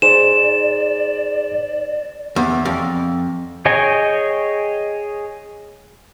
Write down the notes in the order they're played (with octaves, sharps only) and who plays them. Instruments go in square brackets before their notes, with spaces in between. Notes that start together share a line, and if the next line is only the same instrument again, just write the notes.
[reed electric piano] D#4 G#4 C5 [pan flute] D5 [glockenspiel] E7
[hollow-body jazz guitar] E2
F2
[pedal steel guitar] G#4 C#5 D#5 G5 G#5